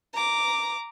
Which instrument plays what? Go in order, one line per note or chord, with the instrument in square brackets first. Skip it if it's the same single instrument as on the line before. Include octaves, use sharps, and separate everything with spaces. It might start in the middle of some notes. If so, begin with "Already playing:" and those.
[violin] A#5 D6